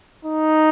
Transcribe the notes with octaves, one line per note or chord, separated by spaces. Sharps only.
D#4